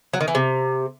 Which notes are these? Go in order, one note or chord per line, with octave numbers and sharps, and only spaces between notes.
F#3
D#3
E3
C3